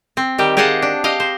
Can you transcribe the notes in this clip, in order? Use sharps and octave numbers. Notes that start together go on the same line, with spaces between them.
C4
D#3 G3 G4
G4 G#4 D#5 F5 F#5 A5
D4
G4 D#5 F5
C5